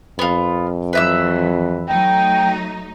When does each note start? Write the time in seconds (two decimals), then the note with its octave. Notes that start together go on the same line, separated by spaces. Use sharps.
0.19 F2 B3 F4
0.93 E3 F#3 B4 E5 E6
1.89 F#3 A3 D#4 G5